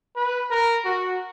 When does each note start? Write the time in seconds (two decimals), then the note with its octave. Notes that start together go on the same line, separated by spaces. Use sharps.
0.16 B4
0.51 A#4
0.85 F#4